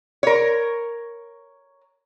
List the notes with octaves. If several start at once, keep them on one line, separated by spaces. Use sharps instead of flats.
A#4 C#5